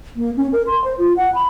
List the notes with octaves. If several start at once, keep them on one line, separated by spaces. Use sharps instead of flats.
A#3
C#4
A#4
C6
C5
F4
F#5
B5